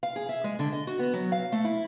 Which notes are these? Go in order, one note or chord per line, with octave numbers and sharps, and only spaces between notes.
F5
G#4
E5
G#3
D3
D#5
F#4
B3
F#3
F5
A3
E4